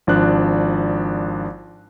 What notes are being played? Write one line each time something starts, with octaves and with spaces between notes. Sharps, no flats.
G#1 F3 D4 F#6